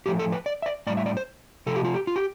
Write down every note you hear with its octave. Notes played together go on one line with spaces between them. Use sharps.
A2 F3 A3 G4
A4
B4
D5
E5
D5
A2 G3 D5
E5
D5
C5
C3 F3 A3 A4
G4
F4
G4
F4
G4